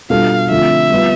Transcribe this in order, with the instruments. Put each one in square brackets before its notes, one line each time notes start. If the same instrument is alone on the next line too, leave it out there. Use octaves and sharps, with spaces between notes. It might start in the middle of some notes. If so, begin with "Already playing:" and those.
[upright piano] B2 G3 D4 F4 A4 [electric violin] F5
[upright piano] D3 F3 A3 C4 F4 [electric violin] E5
[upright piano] G3 B3 F4